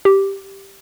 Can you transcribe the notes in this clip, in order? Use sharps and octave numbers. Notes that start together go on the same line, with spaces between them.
G4